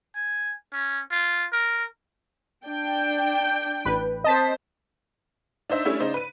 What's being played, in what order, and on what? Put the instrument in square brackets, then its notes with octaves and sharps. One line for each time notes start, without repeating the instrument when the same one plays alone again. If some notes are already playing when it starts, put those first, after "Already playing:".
[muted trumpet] G#5
C#4
F4
A#4
[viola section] D4 G5
[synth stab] A1 B4
[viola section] C4 C5 [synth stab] D#5 A5 B6
[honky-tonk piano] D4 D#4 C5 E5
G3 A3 C#4 D4 E4
C#3 D#4 C5 D5
B4 D#7